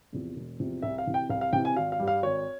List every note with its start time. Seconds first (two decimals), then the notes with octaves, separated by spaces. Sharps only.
0.13 E2 C3 F3
0.36 E1
0.60 E2 C3 F3
0.82 C2 E5
0.98 F5
1.06 C3 E3
1.14 G5
1.30 C2 F5
1.41 F5
1.53 C3 E3 G5
1.65 G#5
1.76 G#1 F5
1.92 F5
1.99 G2 G3
2.08 F5
2.23 G#1 C#5